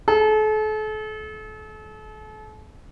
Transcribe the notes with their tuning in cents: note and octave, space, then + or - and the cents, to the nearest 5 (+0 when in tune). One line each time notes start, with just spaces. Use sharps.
A4 -40